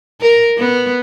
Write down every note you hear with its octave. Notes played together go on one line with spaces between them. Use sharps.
A#4
B3